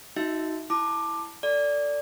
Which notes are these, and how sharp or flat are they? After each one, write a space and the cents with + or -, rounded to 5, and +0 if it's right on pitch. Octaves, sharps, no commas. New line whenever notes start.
D#4 +20 F#4 +0 E5 +0
E4 +0 A5 +0 D6 +15
A4 +25 D5 -10